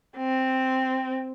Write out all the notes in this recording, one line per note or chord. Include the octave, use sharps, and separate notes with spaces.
C4